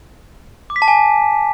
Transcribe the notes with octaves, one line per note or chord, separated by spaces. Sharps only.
D6
B6
A5
G#5